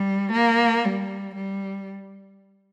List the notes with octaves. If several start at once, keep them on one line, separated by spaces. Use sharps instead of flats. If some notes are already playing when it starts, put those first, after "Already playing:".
Already playing: G3
A#3
G3
G3